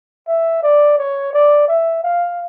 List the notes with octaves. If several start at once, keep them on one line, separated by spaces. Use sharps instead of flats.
E5
D5
C#5
D5
E5
F5